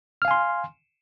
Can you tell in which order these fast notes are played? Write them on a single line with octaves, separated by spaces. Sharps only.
F6 F5 G#5 C6